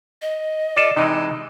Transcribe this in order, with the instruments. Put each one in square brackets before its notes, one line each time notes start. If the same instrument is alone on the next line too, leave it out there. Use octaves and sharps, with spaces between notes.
[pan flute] D#5
[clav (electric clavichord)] F4 A4 [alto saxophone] D5
[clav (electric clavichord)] C3 E3 G#3 [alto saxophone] D#4